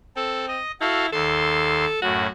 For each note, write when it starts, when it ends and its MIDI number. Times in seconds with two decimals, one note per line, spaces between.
0.16 0.59 60
0.16 0.46 69
0.48 0.71 75
0.81 1.07 64
0.81 1.06 66
0.81 1.06 69
0.81 1.06 77
1.12 1.85 39
1.12 1.98 69
1.12 1.85 84
2.02 2.27 42
2.02 2.27 45
2.02 2.29 66